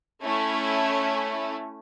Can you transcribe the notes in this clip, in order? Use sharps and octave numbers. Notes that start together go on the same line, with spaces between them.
A3 C#4 E4